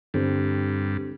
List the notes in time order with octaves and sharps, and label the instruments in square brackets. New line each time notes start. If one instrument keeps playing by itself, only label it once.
[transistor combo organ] G2 [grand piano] D3 G3 C4